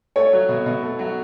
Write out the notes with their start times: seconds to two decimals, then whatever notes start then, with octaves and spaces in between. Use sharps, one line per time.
0.16 A3 C#5
0.33 F#3
0.49 B2
0.66 B2
0.83 A3
0.99 F#3